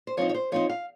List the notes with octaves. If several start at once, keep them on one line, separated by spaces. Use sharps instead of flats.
C5
F3 C4 D#4 C#5
C#5
C5
F3 C4 D#4 C#5
F5